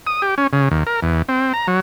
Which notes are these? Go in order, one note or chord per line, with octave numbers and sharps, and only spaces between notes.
D#6
G4
C#4
C#3
D#2
A#4
E2
C4
A#5
F#3